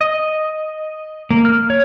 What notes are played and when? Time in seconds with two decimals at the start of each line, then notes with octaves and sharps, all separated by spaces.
0.01 D#5
1.31 A#3
1.45 F6
1.70 C#5